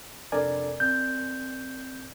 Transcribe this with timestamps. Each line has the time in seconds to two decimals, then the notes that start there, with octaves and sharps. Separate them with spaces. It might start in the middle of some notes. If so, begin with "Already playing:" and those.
0.32 F1 D4 A4 A#4 D5 G#5
0.80 C4 G6